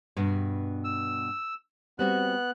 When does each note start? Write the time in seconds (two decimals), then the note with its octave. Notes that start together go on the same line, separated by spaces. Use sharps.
0.16 G2 B2
0.84 E6
1.99 G3 B3 C4 F#4 F#6